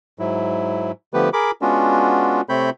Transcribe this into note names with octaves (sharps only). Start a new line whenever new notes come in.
G#2 F#3 E4
D3 F3 A3 B3 G4 B4
G#4 A#4 B5 D6
G#3 B3 C#4 D4 F4 F#4
C3 A3 C4 C#5 B5 G6